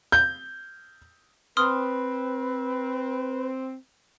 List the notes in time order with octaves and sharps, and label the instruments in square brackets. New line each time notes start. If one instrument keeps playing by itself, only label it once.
[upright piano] G6
[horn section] C4 [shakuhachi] B4 [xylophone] C6 D#6 F6